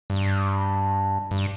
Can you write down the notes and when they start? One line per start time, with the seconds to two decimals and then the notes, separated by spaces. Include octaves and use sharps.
0.10 G2
1.31 G2